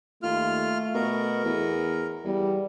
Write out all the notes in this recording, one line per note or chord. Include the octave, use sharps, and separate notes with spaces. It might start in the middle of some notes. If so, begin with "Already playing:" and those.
D#2 A3 F4 F6
B2 A#4
E2
E2 G3